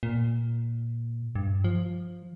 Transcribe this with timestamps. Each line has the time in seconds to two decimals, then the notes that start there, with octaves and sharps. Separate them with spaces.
0.03 A#2
1.35 G2
1.64 F3